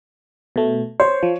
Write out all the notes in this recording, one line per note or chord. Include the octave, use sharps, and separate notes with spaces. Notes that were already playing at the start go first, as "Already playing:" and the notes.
B2 A3
C5 C#5
F3